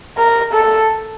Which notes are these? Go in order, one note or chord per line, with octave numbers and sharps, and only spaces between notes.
A#4
A4